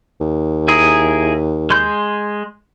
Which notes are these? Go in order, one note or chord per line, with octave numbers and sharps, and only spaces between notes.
D#2
E4 G#4 A#4
G#3 C6 G6